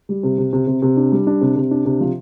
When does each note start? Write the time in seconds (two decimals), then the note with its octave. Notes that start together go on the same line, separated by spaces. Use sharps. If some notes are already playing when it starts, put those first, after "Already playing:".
0.09 G3
0.23 C3
0.38 C3
0.53 C3
0.67 C3
0.82 C3
0.97 D4
1.12 G3
1.27 D4
1.41 C3
1.56 C3
1.71 D4
1.85 C3
2.01 F3